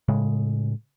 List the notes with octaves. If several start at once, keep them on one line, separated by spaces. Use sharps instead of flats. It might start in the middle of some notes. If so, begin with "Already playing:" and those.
A2 C#3 G#3